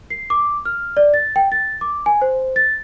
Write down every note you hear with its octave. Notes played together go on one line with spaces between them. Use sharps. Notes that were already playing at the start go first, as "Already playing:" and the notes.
C7
D6
F6
D5
A6
G5
A6
D6
G#5
C5
A6